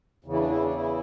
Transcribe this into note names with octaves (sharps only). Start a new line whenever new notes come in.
E2 C#3 E3
E4
D4
E3 E4
D4
E3 E4